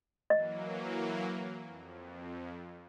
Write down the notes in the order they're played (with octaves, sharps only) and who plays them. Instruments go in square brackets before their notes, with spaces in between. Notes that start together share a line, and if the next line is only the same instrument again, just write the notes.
[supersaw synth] E3 F#3 A#3 [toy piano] D#5
[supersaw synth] F2